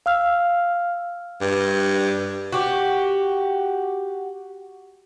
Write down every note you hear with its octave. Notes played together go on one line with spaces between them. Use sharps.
F5 E6 F6
G2
F#4 G4